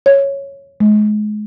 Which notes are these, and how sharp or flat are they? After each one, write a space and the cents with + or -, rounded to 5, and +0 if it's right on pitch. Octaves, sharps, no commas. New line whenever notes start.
C#5 -5
G#3 +30